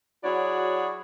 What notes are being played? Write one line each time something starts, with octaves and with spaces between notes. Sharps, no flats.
F#3 E4 F#4 G#4 C#5 D5